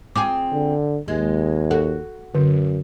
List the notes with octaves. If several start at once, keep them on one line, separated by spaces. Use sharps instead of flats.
C4 F4 G#4 D6
D3
D#2 G#3
F#4 A4
F#2 D3